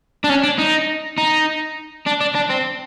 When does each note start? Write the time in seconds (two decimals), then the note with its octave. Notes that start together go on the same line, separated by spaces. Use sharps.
0.24 D4
0.29 C#4
0.43 D4
0.58 D#4
1.18 D#4
2.06 D4
2.21 D4
2.35 D4
2.50 C4